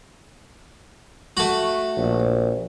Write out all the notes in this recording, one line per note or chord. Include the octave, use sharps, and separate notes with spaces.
A3 F#4
A#1